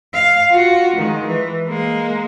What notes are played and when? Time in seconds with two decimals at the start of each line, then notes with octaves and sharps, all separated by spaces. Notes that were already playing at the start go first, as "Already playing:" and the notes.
0.14 F5
0.51 F4 F#4
0.96 D#3 G#3
1.26 E3
1.67 G#3 A#3